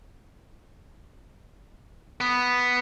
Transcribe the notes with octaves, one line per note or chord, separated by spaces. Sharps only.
B3